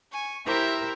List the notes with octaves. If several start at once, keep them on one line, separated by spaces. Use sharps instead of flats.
G#5 C#6
E4 G4 A#4 C5 E5 A#5